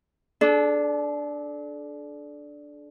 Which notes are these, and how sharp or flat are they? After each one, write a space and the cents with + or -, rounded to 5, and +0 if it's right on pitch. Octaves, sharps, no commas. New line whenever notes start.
D4 +0 A4 -40